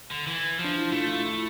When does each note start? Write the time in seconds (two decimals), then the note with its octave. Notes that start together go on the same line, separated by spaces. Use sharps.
0.11 D3
0.27 E3
0.59 F3 D4
0.78 E4
0.92 A3 F4
1.08 F4
1.26 E4